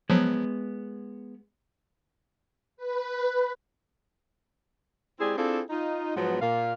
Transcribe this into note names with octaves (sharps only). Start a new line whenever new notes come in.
F3 F#3 G#3 B3
B4
G#3 C4 E4 G4 G#4 D5
C4 D4 E4 F4 G#4 A4
D#4 F4
G#2 F3 F#3 B3
A#2 F5